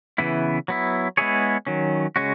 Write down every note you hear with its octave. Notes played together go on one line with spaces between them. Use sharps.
C#3 E3 B3 E4
F#3 B3 E4
G#3 B3 E4 G#4 C#5
D#3 F#3 C#4
C#3 G#3 C#4 F#4